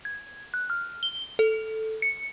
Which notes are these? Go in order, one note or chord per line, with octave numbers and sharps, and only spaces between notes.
G#6
F#6
F6
G7
A4
C#7